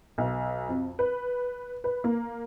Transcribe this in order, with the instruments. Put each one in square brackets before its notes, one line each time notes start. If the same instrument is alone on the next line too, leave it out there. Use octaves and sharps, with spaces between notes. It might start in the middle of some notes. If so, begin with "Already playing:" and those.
[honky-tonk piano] B1
F2
B4
B4
A#3